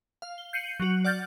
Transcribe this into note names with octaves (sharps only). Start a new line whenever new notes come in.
F5
G7
G6 C7 C#7 D#7 F#7
F#3 F#4
D5 F#5 F6 G6 A6